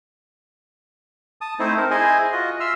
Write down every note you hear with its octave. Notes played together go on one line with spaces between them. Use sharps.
A5 D#6
A3 C4 D#4 E4 C5
D#4 A#4 C5
E4 G#4 C5 D#5 G#5
F4 F#4 D#5
E5 C6 E6 F6